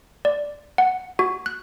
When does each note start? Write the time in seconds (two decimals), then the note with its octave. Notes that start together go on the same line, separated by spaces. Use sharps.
0.25 D5
0.78 F#5
1.19 F#4
1.46 F#6